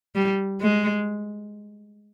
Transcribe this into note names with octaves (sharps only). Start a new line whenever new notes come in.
G3
G#3